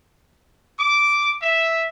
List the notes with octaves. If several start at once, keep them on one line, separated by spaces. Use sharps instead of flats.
D6
E5